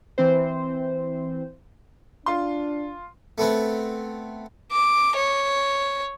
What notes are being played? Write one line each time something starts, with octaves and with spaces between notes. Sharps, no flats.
E3 C4 C5
D4 F4 C6
A3 B3 C4
D6
C#5